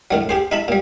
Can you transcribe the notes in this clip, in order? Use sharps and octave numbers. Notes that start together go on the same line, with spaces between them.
A2 D#3 F#3
G4 G#4 C5
D#4 E4 E5 A5 B5
A#2 G3